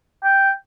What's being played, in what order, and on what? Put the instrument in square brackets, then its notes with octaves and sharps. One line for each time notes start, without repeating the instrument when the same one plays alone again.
[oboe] G5